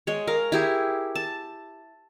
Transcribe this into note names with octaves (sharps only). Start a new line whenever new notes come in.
G#3 C#5
A#4 F5
E4 G4 G#4
A5